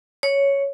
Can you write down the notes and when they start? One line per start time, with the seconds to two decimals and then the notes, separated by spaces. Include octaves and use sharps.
0.23 C#5